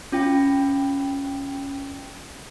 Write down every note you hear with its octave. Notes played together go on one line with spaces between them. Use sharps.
C#4 F4 G5